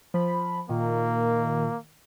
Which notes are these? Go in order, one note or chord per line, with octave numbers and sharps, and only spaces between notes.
F3 B5
A#2 D#3 A#3